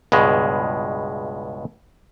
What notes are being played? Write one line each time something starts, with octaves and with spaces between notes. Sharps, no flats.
C#2 G2 B2 G#3